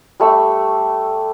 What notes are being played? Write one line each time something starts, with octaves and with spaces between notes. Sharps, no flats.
G3 A3 C#6 E6